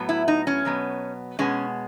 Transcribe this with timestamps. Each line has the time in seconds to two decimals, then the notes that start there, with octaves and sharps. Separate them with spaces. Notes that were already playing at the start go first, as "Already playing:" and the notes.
Already playing: A2 F#3 B3
0.09 E4
0.28 D#4
0.47 C#4
0.65 B2 F#3 B3
1.39 B2 G#3 B3 C#4